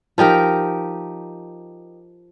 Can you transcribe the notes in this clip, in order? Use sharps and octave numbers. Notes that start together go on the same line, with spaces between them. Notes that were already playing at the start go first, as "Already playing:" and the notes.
F3 D#4 G4 A#4